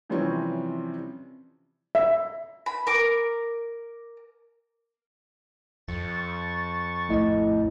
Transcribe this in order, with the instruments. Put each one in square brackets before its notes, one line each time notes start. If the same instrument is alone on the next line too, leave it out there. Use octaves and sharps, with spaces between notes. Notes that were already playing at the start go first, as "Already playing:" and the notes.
[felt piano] C3 E3 F3 G3 C4 C#4
[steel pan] E5
[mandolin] B5
A#4 D6
[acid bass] F2 [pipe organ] C#6 A6
[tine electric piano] A#1 D#5 [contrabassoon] A2